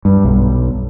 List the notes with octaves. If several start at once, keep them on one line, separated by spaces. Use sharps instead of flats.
G2
B1